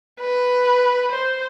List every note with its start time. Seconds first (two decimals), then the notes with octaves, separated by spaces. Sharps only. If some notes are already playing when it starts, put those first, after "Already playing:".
0.20 B4
1.11 C5